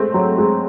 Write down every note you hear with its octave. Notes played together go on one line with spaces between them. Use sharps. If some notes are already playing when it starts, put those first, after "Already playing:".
Already playing: G#3 A3 C4
F#3
G#3